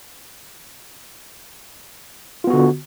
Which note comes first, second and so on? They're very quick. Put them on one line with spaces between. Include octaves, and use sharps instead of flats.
F4 B3 F#4 D3